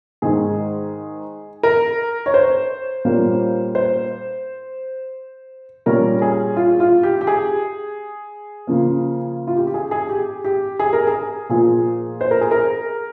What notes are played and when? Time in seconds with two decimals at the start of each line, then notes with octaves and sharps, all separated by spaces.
0.22 G#2 D#3 G#3 G#4
1.63 A#4
2.26 C#5
2.34 C5
3.05 A#2 G3 A#3 C#4
3.75 C5
5.86 A#2 G3 C#4 A#4
6.22 G#4
6.57 F4
6.80 F4
7.03 G4
7.21 G4
7.27 G#4
8.67 C#3 F3 A#3
9.47 F4
9.56 G4
9.67 G4
9.74 G#4
9.91 G#4
10.09 G4
10.44 G4
10.79 G#4
10.93 A#4
11.07 G#4
11.49 A#2 F3 A#3 G#4
12.21 C5
12.31 A#4
12.41 G#4
12.51 A#4